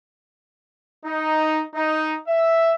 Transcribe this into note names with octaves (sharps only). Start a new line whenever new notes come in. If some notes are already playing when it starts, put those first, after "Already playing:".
D#4
D#4
E5